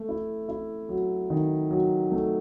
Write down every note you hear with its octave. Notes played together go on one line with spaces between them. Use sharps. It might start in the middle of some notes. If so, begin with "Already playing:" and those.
Already playing: A3
E4
E4
F#3
D#3
F#3
A3